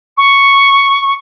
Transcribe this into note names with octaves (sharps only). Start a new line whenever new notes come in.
C#6